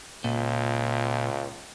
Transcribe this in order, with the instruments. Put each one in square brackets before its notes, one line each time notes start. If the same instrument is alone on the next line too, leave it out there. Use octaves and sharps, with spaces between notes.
[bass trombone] C#2 [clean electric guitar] A#2